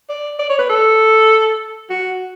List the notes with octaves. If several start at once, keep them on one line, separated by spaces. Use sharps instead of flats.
D5
D5
C#5
B4
A4
F#4